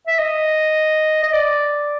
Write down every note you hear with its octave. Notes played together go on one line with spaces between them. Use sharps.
E5
D#5
D#5
D5